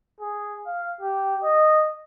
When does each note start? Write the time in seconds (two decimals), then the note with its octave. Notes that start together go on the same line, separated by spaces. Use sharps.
0.20 G#4
0.66 F5
1.01 G4
1.43 D#5